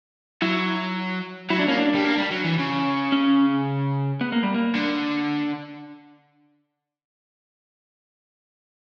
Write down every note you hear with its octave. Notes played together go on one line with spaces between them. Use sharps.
F#3 E4
F#3 E4
D4
A#3 C#4
D4
G3
A#3
G3
F#3
E3
C#3
C#4
B3
A#3
G3
A#3
D3